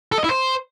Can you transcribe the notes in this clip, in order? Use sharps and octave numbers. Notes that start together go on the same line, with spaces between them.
A4
D#5
E4
C5